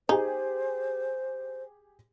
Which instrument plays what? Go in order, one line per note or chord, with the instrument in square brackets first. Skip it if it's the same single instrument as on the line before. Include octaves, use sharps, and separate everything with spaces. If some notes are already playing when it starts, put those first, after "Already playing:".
[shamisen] D#4 [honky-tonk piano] G4 G#4 G#5 [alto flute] C5